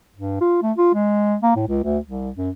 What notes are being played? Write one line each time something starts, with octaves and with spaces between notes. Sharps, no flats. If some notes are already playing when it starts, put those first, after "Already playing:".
G2
F4
A3
F4
G#3
A#3
A2
C#2
D2
C2
F#2